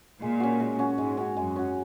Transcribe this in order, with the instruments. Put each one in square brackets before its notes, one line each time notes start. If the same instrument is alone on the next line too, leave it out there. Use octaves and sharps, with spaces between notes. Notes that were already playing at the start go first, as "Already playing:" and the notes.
[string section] A#2 [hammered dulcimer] G#3
[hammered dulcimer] C#4 F#4
G#3
C#4 F#4
[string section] G#2 [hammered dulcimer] G#3
[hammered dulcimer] C#4 F#4
[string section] F#2 [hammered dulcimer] G#3
[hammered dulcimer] C#4 F#4